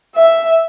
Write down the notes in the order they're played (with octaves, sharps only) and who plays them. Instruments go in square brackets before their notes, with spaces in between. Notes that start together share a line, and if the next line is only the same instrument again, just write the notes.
[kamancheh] E5